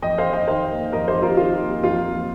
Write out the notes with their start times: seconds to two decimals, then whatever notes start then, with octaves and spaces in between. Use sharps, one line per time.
0.02 F2 D#5 G5
0.18 C5 F5
0.25 F2
0.33 D#5 G5
0.48 D#3 C5 F5
0.71 A#3
0.92 F2 A#4 D#5
1.08 G4 C5
1.15 F2
1.22 F4 A#4
1.37 D#3 F4 A#4
1.60 A#3
1.83 F2 F4
2.05 A#3